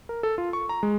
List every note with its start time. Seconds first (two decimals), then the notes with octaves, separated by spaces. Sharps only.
0.09 A#4
0.23 A4
0.38 F4
0.53 C#6
0.69 A#5
0.83 G#3